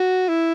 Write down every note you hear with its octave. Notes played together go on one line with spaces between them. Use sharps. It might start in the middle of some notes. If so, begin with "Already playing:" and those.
Already playing: F#4
E4